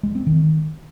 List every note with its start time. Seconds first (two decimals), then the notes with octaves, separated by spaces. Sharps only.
0.03 G#3
0.15 C4
0.27 D#3